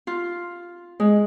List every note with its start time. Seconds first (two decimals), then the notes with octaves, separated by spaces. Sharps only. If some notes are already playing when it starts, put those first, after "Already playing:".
0.07 F4
1.00 G#3